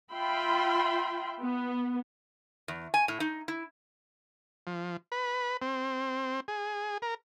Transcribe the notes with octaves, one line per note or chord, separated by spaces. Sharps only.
F4 E5 G5 B5 C6
B3
E2
G#5
A2
D#4
E4
F3
B4
C4
G#4
A#4